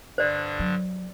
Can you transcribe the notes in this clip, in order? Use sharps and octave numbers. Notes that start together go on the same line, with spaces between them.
G2 D3 D4 C5 D5
F#3